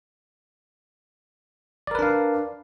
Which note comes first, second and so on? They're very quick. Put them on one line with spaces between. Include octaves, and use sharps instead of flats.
D5 A#4 B4 D4 F5